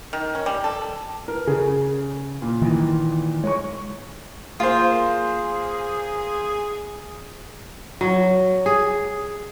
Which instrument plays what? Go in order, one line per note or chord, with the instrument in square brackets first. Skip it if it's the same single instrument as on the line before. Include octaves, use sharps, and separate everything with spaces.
[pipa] D#3
C#4
G3
A4
[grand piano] A#4 B4
[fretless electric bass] C#3 [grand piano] G#4
[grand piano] A#2
[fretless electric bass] D#3 E3
[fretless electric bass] G#3 [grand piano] C#5 C#6
[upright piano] A#3 C5 [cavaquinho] F4 [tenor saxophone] G#4
[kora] F#3
G#4